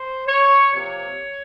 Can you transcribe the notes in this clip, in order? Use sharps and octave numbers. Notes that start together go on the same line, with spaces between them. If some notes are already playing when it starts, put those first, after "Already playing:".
Already playing: C5
C#5
C3 F3 A#3 C#5